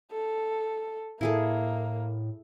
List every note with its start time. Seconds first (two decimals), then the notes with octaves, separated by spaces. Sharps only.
0.12 A4
1.21 A2 A#3 E4 G#4 A4